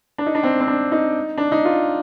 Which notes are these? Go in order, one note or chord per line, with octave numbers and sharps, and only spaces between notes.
D4
D#4
D4
C4
C4
D4
D#4
D4
D#4
F4